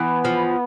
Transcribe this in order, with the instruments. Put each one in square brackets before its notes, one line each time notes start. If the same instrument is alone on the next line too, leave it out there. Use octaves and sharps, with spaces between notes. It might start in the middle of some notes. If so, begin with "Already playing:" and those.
Already playing: [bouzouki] E3 [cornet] B3
[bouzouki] F3